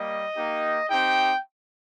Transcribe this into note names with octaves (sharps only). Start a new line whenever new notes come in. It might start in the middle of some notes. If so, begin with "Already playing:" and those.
Already playing: G3 A#3 D#5
A#3 D#4 G4
C4 D#4 G4 G5